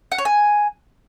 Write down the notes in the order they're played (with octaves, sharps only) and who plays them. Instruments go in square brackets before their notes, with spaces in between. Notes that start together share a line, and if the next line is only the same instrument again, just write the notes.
[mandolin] F#5
C#5
G#5